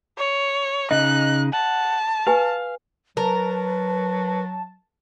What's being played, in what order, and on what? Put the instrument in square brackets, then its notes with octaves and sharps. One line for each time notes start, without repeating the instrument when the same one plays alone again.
[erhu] C#5
[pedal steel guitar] C#3 D#4 [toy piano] D#5 [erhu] F#6
[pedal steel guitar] F#5 [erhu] A5
[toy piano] G4 B4 G#5 [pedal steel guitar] F5
[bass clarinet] F#3 [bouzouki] A#4 [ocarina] B4 [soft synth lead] A5